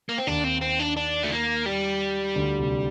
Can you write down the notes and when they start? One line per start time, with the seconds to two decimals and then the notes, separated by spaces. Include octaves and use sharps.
0.09 A#3
0.18 C4
0.27 D#2 D#3 D4
0.44 C4
0.61 C4
0.79 D4
0.97 D4
1.23 A3
1.32 A#3
1.66 G3
2.36 D2 D3
2.59 C2 C3